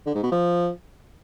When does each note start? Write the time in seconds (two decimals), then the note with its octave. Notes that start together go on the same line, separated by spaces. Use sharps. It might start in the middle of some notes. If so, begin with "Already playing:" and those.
0.06 D3
0.15 G#2
0.23 B2
0.32 F3